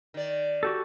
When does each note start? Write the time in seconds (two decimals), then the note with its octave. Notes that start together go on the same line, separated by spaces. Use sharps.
0.14 D#3 D5
0.63 F#4 G4 A4